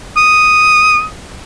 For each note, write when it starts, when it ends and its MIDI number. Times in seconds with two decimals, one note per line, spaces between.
0.17 1.05 87